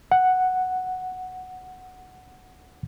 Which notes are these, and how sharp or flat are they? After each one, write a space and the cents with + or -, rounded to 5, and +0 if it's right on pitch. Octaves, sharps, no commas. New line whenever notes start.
F#5 +0